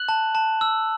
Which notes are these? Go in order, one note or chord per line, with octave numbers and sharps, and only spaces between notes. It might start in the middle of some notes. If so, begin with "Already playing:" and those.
Already playing: F#6 F#7
A5
A5
E6